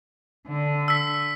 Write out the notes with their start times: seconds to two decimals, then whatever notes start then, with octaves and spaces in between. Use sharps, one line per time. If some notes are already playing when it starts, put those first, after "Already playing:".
0.48 D3
0.88 E6 B6